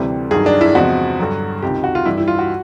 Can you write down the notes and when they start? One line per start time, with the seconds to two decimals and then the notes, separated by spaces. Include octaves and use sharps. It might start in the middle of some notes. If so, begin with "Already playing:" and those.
Already playing: D2 C3 E3 G3
0.31 G2 D#3 F#3 G#4
0.46 D4
0.61 E4
0.75 E2 C3 F3 G#3 F#4
1.19 G2 D3 F#3
1.62 C#2 C3 D#3 G4
1.84 F#4
1.95 F4
2.06 G2 E3 G3 E4
2.17 E4
2.28 F4
2.39 F#4